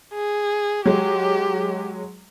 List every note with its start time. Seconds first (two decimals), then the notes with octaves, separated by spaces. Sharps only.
0.14 G#4
0.86 F#3 G#3 G4